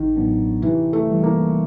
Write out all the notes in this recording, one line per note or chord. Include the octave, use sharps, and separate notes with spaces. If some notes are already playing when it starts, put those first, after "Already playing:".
Already playing: A1 D#3
A2 F#3 B3 D4
C3 E3
A3
E3 G3
A#3